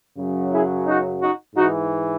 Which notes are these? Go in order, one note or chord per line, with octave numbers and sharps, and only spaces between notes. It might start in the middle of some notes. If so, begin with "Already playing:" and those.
F#2 C#3 F#3
E4 G#4
D#4 F#4
D#4 F#4
G#2 E3 D#4 F#4